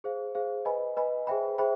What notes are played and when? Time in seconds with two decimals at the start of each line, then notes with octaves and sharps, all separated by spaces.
0.04 G#4 C5 F5
0.35 G#4 C5 F5
0.65 B4 D#5 G#5 B5
0.97 B4 D#5 G#5 B5
1.27 G#4 C5 E5 G5 B5
1.58 G#4 C5 E5 G5 B5